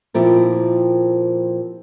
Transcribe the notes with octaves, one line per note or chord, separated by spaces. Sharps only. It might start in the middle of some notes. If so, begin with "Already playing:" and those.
A#2 F3 C4 E4 G4 A#4